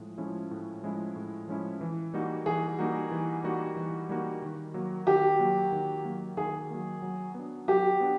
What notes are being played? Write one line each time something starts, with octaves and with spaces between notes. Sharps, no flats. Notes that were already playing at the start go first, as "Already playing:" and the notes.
Already playing: A2 F3 G#3
F3 G#3 C#4 E4
A2
F3 G#3 C#4 E4
A2
F3 G#3 C#4 E4
E3
G3 A#3 D#4 F#4
E3 G#4
G3 A#3 D#4 F#4
E3
G3 A#3 D#4 F#4
E3
G3 A#3 D#4 F#4
D#3
F#3 A#3
D#3 G4
F#3 A#3
D#3
F#3 A#3
D#3 G#4
F#3 A#3
F#3
B3 D4
F#3 G4
B3 D4